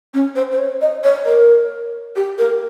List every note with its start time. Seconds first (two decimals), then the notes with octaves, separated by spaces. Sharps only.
0.14 C#4
0.36 C5
0.51 C5
0.58 C#5
0.81 D#5
1.04 C#5
1.26 A#4
2.16 G4
2.38 A#4